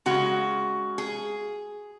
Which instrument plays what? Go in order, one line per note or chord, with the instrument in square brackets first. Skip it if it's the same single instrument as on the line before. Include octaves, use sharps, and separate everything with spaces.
[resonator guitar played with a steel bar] C#3 G#3 F#4
G#4